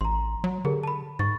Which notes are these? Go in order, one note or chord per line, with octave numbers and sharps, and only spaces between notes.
A1 A#5 C6
F#3
D3 G4 G#4 A#4
A5 B5
G#2 C#6 A6